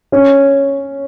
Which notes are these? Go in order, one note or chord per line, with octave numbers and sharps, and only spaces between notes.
C#4